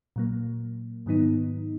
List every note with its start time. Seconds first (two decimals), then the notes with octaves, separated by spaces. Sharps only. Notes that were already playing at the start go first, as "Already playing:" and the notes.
0.16 A#2 F#3 A#3
1.06 G#2 D#3 F#3 B3 D#4